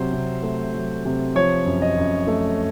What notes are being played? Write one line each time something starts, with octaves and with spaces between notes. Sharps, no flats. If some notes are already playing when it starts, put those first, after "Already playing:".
Already playing: C3 F#3 C5
C3
A3
F#3
C3
F3 C#5
F#2
D#5
F#2
A3